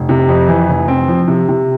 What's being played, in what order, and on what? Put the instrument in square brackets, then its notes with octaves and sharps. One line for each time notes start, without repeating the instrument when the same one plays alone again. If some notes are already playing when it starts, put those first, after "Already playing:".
Already playing: [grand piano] F1
C3
F2
E3
F1
C4
F3
C3
C3